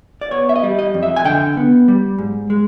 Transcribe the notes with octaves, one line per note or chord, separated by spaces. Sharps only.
D5
B3 C#5
E5
D#5
G3
D#5
F2
E5
G#5
D3 G5
B3
G3
G#2
G#3